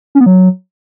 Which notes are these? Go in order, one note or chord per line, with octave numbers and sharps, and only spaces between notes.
C#4
B3
F#3